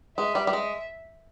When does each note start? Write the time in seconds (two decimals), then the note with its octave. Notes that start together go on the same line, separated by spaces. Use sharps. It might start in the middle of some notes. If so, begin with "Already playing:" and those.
0.17 G#3 E5
0.35 G3
0.47 G3
0.53 G#3